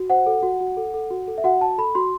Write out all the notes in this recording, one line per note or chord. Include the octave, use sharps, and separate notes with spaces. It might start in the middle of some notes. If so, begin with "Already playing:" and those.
Already playing: F#4
C5 F#5
A4
F#4
F#4
A4
A4
F#4
A4
E5
F#4 F#5
F#4 A5
A4 B5
F#4 C6